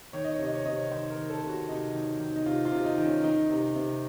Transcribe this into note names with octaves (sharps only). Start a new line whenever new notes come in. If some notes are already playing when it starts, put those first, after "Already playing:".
D#3 C#5
D#5
C3 C#5
D#5
C#5
C3 D#5
C#5
D#3 C5
A#4
D#3
A4
C3
F#4
C3 D#4
D#3
D#3
D#4
C3 F4
F4
C3
D#4
D#3
C#4
D#3 D#4
C3
C3